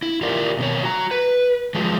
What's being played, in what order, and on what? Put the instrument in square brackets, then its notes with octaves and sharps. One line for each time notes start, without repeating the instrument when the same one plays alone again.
[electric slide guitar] E4
F4 G4 A#4 D5
B2 D#3 C#5
F#4 A#5
B4
F3 F#3 G#3